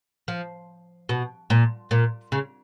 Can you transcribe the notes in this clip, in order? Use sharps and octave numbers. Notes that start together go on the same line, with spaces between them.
F3
B2
A#2
A#2
C#3